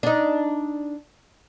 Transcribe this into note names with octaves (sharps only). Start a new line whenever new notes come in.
D4 D#4